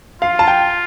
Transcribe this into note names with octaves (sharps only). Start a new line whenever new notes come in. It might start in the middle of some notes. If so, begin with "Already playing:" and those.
F4 F5
A5
G5